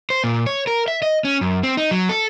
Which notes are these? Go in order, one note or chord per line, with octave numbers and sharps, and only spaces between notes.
C5
A#2
C#5
A#4
E5
D#5
C#4
F#2
C4
D#4
F#3
A4